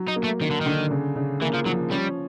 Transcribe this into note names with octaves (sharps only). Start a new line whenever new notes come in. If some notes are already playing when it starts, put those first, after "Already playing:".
Already playing: F#3
D#4
A#3
A3
D#3 A#3
D3
D3 D#3
C#3
C#3
E3 A#3
F3
F3 F#3
G3 C#4